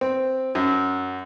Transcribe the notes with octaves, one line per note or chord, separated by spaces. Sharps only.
C4
F#2